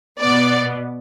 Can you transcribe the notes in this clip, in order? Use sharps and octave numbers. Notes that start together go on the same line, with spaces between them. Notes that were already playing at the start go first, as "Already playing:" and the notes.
B2 B3 D5